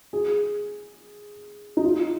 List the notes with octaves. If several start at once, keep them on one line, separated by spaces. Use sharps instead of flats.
G#4
D#4
F4